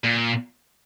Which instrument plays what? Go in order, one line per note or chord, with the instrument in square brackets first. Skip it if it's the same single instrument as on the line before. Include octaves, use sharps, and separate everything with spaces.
[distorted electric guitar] A#2